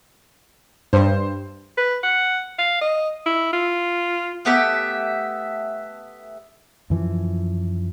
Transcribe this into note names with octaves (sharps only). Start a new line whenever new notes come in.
G2 C5
B4
F#5
F5
D#5
E4
F4
A3 B3 G4 E5
F#2 E3 F3